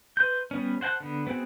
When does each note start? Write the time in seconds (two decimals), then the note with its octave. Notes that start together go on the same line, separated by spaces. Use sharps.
0.17 B4 C6 G6
0.51 G3 B3 C#4
0.81 C5 F#5 G#5 A5 F#6
1.00 D3 B3
1.27 B3 C4 F#4 G#4